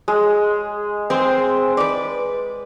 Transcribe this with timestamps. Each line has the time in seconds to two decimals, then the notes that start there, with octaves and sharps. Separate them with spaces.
0.08 G#3
1.10 C4 G#4 C5
1.77 B4 D5